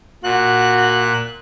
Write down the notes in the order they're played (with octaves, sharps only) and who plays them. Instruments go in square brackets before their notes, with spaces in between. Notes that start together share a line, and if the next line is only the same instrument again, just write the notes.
[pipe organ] A#2 F#6 [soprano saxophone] F#4